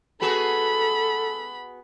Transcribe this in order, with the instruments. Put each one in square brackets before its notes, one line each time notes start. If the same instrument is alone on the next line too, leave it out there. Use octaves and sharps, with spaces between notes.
[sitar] B3 F#4 G#4 [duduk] A4 [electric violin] B5